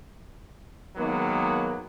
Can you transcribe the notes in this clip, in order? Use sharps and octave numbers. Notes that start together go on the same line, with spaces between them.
D#3 F#3 G#3 A#3 B3